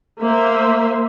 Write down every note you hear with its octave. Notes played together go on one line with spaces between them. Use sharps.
A#3 C5 E5